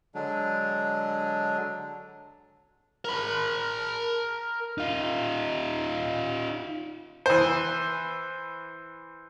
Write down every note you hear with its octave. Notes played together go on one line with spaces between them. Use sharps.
D3 F#3 G#3 D4
A#4 B5
D#4 F4
E3 C5